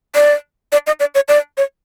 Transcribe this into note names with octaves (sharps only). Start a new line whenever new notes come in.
D5
D5
D#5
D5
C#5
D5
C#5